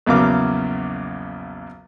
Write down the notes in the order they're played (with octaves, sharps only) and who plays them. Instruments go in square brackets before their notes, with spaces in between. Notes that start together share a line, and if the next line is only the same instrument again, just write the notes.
[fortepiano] A#1 E2 C#3 F#3 A#4 D6